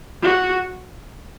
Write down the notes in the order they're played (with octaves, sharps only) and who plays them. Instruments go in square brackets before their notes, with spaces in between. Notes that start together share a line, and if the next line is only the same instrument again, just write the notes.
[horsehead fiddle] F#4